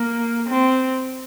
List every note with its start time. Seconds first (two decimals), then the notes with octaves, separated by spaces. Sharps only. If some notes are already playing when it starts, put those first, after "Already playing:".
Already playing: A#3
0.48 C4